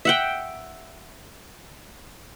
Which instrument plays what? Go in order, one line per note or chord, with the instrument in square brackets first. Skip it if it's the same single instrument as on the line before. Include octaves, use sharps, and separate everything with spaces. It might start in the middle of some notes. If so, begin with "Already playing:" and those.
[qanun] E5 F#5 G5